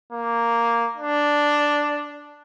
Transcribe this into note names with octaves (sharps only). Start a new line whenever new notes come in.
A#3
D4